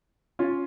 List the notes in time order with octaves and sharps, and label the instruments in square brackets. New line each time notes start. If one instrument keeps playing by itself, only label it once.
[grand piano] C#4 F4